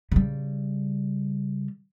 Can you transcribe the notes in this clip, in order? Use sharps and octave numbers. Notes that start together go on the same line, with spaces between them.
C#3 G3